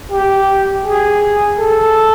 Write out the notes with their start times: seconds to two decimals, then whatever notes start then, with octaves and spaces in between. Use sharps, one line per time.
0.12 G4
0.85 G#4
1.59 A4